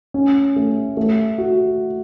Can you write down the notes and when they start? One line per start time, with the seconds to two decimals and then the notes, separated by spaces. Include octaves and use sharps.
0.14 C#4
0.56 A3
0.97 A3
1.38 F#4